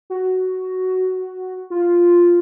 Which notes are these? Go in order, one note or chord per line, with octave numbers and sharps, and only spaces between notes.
F#4
F4